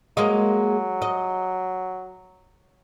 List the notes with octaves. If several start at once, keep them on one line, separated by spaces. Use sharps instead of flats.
F#3 G#3 A#3 D#5
D#5